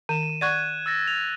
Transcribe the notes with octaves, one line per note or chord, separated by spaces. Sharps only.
D#3 D#7 E7
D5 F#5 C#6 F#6 G#6 D#7
E6 A6 A#6
F7